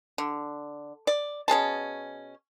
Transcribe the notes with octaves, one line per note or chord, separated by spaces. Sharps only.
D3
D5
B2 C#4 G#4 A5